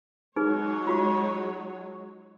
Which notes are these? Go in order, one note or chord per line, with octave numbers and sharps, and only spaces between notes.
F#3 G#3 D#4 G#4 B4 C#5
F4 F#4 C#6